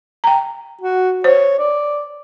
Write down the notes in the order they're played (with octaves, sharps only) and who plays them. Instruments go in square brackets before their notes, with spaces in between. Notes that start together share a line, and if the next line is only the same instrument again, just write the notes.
[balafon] G5 A#5
[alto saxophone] F#4
[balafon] C5 [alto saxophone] C#5
[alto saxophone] D5